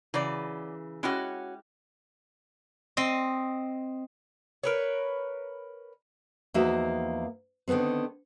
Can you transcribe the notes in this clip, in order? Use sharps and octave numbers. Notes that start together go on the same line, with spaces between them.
C#3 E3 F#3 D5
G#3 C#4 E4 F#4 G4
C4 D#5
A#4 B4 C#5
E2 F3 A#3 D#4 F#4 E5
D3 D#3 F#3 B3 C4